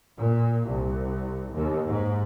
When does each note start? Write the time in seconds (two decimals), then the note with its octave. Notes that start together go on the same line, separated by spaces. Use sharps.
0.17 A#2
0.65 C2
1.53 D#2
1.86 G#2